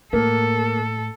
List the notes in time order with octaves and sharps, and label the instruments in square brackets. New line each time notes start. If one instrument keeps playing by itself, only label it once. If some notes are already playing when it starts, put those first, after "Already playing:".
[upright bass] A2 [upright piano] A#3 [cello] A4